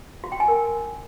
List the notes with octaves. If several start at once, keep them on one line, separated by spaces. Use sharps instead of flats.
F#4
G5
G#5
A#4